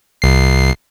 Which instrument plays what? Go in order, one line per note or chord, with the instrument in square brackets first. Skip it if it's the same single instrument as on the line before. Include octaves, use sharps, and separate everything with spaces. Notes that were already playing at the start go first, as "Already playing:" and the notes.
[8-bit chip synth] C2 C7